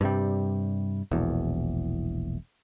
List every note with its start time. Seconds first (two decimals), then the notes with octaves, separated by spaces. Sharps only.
0.01 G2 C3 G3
1.11 E1 A#1 E2